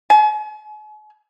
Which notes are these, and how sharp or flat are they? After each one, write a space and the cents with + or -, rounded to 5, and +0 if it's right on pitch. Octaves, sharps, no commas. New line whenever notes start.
G#5 +40